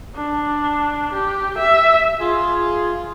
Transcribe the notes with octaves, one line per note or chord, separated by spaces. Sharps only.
D4
G4
E5
F4 G#4